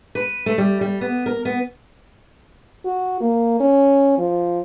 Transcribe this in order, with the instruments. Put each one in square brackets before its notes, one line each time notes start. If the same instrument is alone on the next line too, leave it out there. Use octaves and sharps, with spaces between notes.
[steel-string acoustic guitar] B4
A3
G3
G3
B3
A#4
B3
[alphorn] F#4
A#3
C#4
F3